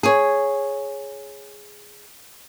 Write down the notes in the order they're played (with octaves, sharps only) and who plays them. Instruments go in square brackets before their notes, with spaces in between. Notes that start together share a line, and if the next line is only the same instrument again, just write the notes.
[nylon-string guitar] G#4 C#5